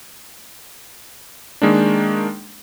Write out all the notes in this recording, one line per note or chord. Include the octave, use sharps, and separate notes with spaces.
D#3 G#3 A#3 D4